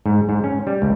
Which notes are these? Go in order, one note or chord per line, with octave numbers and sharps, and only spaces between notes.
G#2
G#2
C#4
G3
C#2